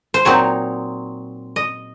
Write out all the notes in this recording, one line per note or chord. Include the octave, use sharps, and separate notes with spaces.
C5
A#2 F#3 C4 D#4 C#5
D#5